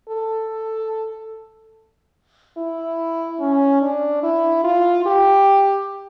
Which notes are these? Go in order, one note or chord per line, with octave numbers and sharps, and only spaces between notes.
A4
E4
C#4
D4
E4
F4
G4